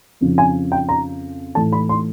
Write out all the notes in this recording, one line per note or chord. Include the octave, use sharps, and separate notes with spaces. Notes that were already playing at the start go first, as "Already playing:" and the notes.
F2 C#3 F3
G#5
G5
A#5
A2 E3 A3 A5
B5
C6